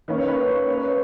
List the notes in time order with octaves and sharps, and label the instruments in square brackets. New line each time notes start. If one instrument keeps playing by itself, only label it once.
[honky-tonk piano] D#3 A#3 C#4 [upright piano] B4
[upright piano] C#5
B4
C#5
C#5
B4
C#5